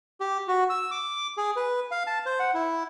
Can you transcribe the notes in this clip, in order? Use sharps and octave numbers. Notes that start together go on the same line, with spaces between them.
G4
F#4
E6
D6
G#4
B4
F5
A5
C5
F#5
E4